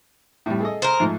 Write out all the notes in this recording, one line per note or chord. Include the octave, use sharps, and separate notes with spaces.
A2 G3
G#4 A4 D#5
A#4 C5
G#2 F3 A3